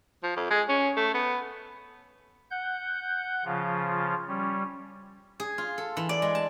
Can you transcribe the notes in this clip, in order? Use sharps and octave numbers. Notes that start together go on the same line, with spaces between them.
F3
F2
G#3
C#4
A3
B3
F#5 G6
C#3 F3 F4
G3 C#4
G#4
F4
A4
E3
D5
G#3
A5